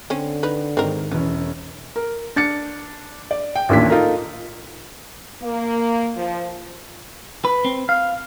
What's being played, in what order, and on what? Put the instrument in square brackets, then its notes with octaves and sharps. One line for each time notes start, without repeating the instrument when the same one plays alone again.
[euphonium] D3 [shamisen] C4 C#4
[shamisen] D#4 B4
[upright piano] G#2 D#3 [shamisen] C4 A#4
[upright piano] E1 E2 C#4 [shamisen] B3
[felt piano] A#4
D4 A6 C#7
D5
G5
A1 D#2 A#2 D4 B6
D#4 F4 A4 A#4
[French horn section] A#3
F3
[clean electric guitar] B4
C4
F5